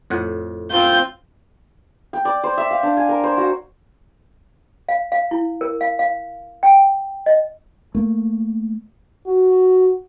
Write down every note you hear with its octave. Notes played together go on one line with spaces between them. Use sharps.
F2 A2 F#5
C4 F4 G6
G5
D5
C5
E5
F5
D4
G#5
A#4
C5
F#4
F5
F5
E4
A#4
F5
F5
G5
D#5
A3 A#3
F#4